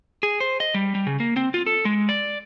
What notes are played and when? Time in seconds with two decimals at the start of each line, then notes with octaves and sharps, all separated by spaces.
0.23 G#4
0.40 C5
0.60 D#5
0.74 G3
0.95 G3
1.07 C#3
1.20 A#3
1.37 C4
1.54 F4
1.66 A4
1.85 G#3
2.09 D5